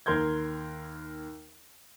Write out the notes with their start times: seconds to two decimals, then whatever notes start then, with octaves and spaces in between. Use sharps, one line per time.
0.06 D#2 A#4 C6 G6 G#6